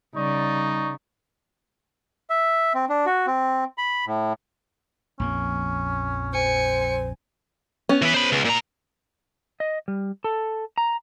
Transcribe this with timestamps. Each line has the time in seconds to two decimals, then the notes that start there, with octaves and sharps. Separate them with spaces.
0.16 C#3 G3 D#4 D5 C#6
2.30 E5
2.75 C4
2.89 D4
3.06 F#4
3.27 C4
3.78 B5
4.07 A2
5.20 A#1 F2 A#3 C#4
6.34 C5 G#5 C#7
7.89 B3 C#4
8.02 E3 B4
8.14 C5 B5
8.32 C#2
8.45 A#2 A#5
9.60 D#5
9.88 G3
10.24 A4
10.78 A#5